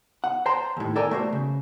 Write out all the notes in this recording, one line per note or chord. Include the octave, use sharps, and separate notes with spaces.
F#5
C5 G5 A5 A#5 C6
D#2 A2
A4 A#4 D5 G5 G#5 A#5
A3 F#4 C5
C#3